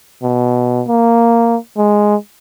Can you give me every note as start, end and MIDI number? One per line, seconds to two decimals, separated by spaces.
0.23 0.83 47
0.88 1.57 58
1.77 2.16 56